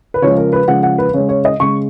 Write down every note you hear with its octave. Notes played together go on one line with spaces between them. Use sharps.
B4
C#3 F3 G#3 C#5
A#4
B4
C#3 F3 G#3 F#5
F#5
B4
C#3 G#3 C#5
C#5
D#5
C#3 G#3 C#6